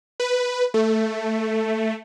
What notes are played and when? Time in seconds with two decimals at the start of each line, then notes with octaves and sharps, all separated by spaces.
0.20 B4
0.74 A3